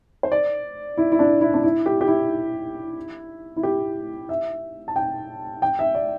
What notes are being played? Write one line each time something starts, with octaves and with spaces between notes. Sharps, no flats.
C5
D5
E4
E4
D4
E4
D4
E4
G4
G4
E4
E4
G4
E5
A5
G5
G5
E5
D5